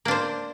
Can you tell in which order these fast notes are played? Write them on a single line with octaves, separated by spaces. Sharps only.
A#3 D4 C5